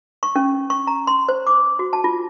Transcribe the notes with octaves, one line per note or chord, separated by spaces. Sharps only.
C#6
C#4
C#6
A#5
C6
C5
D6
F#4
A5
F4